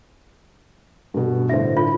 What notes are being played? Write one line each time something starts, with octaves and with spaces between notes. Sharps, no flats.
G2 B2
A2 D3 C5 E5
F4